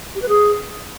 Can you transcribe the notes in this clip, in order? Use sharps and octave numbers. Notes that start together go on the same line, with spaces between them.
G4
B4
G#4